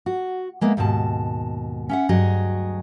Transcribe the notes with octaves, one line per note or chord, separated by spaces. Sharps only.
F#4
G#3 A#3 B3 E5
D#2 G#2 B2 A5
C#4 E5 F#5
D2 G2 F#3 G#4 D#5